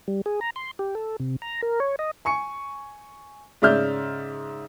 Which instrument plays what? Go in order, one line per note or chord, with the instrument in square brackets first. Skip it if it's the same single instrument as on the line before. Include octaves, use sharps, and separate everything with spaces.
[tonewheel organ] G3
G#4
A#5
C6
G4
A4
C3
A#5
A#4
C#5
D#5
[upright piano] G#5 C#6 C#7
G#2 C#3 D5 E5 F6 G6